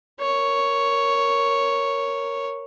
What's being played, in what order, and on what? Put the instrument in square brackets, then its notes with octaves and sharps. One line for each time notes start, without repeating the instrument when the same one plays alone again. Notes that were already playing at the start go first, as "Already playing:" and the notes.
[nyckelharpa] A#4 C#5